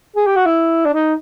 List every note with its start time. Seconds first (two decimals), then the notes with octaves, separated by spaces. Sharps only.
0.16 G#4
0.26 G4
0.36 F#4
0.46 E4
0.85 D4
0.94 D#4